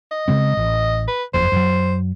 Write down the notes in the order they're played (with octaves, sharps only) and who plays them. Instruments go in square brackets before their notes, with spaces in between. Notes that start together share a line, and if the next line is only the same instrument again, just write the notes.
[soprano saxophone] D#5
[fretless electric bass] C#3 G#3 C4
A1
[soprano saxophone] B4
[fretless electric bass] F#1 F2 [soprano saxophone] C5
[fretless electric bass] F#2 F#3